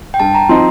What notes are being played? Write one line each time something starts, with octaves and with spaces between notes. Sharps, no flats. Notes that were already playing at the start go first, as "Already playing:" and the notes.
G5
G2 A5
A#5
F3 C4 D#4 C6